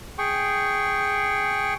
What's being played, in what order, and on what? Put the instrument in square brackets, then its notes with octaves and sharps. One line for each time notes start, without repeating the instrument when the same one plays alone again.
[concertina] G#4 G5 C#6